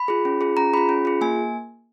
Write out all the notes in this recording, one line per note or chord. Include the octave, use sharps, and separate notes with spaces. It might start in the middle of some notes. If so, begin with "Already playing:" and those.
Already playing: B5
F4 G#4
C#4
F4 G#4
C#4 A#5
F4 G#4 B5
C#4
F4 G#4
A#3 G#5